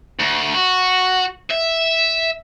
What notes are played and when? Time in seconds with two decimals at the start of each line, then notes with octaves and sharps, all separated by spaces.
0.20 D2
0.54 F#4
1.50 E5